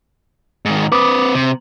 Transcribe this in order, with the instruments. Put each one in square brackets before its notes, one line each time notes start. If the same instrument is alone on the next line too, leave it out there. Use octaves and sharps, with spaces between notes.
[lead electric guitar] G#2 D#3
[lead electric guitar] C4 B4 [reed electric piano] D6 D#6
[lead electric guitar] C3